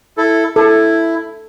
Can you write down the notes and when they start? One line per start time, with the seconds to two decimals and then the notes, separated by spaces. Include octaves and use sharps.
0.18 E4 A4
0.56 E4 A4